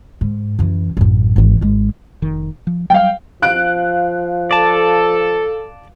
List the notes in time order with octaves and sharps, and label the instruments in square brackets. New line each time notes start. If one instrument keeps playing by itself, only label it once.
[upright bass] G#2
F#2 E3
A1 F#2
G#1 E3
G#1 G#3
[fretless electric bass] F1 D#3
F3
[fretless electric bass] F#3 G3 [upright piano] F5 G5
[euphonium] F3 [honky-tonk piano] F5 F#6 D7
[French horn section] A4 [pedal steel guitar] D5 A5